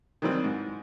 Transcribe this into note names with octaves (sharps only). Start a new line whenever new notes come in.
D#3 E3 F#3 G3 C4
G#2